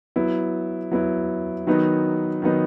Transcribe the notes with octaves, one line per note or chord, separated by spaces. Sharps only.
F#3 B3 E4
F#3 B3 E4
D#3 F#3 B3 D#4
D#3 F#3 B3 D#4